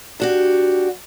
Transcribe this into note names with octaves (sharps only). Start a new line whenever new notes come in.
D4 F#4 G4